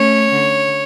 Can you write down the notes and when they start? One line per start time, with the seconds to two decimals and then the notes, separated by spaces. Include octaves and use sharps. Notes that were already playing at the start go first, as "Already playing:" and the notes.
Already playing: A3 C#4 C#5
0.32 D3